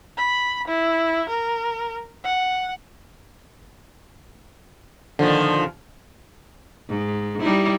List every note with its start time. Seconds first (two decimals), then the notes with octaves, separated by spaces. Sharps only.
0.17 B5
0.68 E4
1.29 A#4
2.24 F#5
5.19 A#2 D3 D#3 F3
6.89 G#2
7.41 G3 D#4 E4